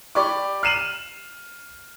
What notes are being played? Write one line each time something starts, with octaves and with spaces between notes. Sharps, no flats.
G4 D5 B5 C#6 D6
F6 C7 D#7 E7 F#7